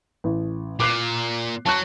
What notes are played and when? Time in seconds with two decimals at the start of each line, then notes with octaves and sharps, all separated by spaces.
0.24 A1
0.80 A#2 D6 F#6 C7
1.66 F#3 A5 C#6 F#6